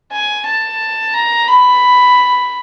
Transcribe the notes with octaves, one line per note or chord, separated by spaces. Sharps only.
G#5
A5
A#5
B5